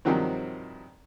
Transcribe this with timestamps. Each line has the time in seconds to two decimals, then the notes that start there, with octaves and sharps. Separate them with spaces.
0.05 G2 C3 D#3 F3 F#3 C4